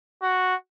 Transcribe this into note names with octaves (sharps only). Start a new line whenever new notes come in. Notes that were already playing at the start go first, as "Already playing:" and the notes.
F#4